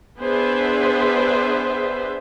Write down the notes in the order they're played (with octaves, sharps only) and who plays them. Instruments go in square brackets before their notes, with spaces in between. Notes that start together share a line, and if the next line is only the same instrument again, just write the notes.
[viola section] B3 D4 G#4 B4 C5 E5